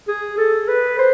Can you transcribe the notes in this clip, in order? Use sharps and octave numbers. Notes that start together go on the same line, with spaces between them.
G#4
A4
B4
C5